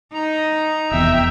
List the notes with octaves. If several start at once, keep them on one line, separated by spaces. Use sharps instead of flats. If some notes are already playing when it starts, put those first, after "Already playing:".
D#4 A#5
F1 E2 E5 G5